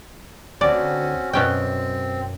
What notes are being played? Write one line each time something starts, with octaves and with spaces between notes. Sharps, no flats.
D2 C4 C#4 F#4 D5
F#2 B2 C4 C#4 G5